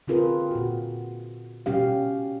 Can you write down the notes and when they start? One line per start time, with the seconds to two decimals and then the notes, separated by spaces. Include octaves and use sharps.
0.08 D3 C4 F4 G#4 A#4 B4
0.51 A#2 F#4
1.66 B2 G3 C#4 G4 F5